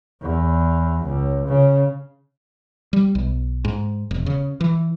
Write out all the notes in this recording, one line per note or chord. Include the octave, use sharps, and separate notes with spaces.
E2
C#2
C#3
G3
B1
G#2
E1
C#3
E3